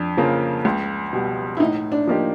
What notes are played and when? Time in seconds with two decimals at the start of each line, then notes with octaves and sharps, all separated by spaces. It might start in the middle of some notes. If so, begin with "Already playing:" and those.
Already playing: F2 D4
0.17 C#3 F3 A#3
0.65 C#2
1.13 B2 G3
1.57 E4
1.60 A2 D#4
1.92 D4
2.07 F3 A#3 D#4 G4